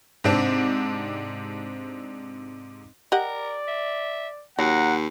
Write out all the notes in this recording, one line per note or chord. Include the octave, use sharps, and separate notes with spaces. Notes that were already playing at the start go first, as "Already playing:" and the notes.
G#2 C3 C4 D4
G4 A#4 D5 D#5 F#5
E5
D#2 F#3 F#5 A#5